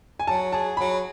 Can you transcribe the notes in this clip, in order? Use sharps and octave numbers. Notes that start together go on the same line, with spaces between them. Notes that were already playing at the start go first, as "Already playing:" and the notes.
G#5
F#3 A5
G#4 A5
F#3 B5